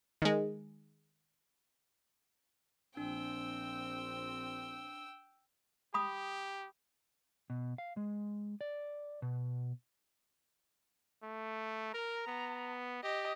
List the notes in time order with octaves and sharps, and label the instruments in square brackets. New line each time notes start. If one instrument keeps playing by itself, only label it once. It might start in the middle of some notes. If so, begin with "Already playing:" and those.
[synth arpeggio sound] D#3 G#3
[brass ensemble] A#1 C4 [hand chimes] D4 [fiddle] G5 E6
[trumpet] G4 [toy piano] B5 D#6
[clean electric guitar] B2
F5
G#3
D5
B2
[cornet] A3
[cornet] A#4 [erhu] A#5
[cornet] B3
[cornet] G4 [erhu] D#5